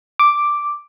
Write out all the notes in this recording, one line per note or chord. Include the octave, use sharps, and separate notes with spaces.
D6